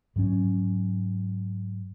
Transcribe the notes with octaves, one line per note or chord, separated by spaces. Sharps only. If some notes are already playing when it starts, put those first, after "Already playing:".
G#2 F#3 C#4